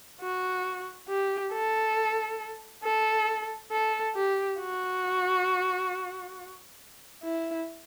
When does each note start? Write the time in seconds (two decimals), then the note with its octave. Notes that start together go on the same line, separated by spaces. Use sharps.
0.21 F#4
1.09 G4
1.52 A4
2.84 A4
3.72 A4
4.16 G4
4.60 F#4
7.24 E4